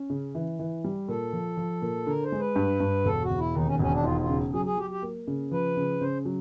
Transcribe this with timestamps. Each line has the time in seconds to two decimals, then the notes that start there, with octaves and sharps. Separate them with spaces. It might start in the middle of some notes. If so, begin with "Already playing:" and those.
Already playing: C#4
0.10 C#3
0.35 E3
0.59 E3
0.84 G3
1.08 A#2 A4
1.33 F3
1.57 F3
1.82 A#2
2.07 D3 A#4
2.23 C5
2.32 G#3
2.39 B4
2.56 G2
2.80 G2
3.05 E1 A4
3.22 F#4
3.30 E1
3.38 E4
3.55 D#2 D#4
3.67 C#4
3.79 E1 C#4
3.92 D4
4.03 D#4 F4
4.21 F4
4.29 C#3
4.53 F#3 G#4
4.65 G#4
4.77 F#3 G4
4.90 G4
5.02 A#3
5.27 C#3
5.51 F3 B4
5.77 C#3
6.01 C#3 C5
6.25 F#3